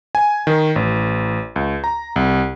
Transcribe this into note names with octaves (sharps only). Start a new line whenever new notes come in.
G#5
D#3
A1
C#2
A#5
C2